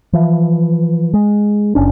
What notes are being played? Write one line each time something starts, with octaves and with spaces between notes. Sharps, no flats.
E3 F3
G#3
F#1 C#4 D4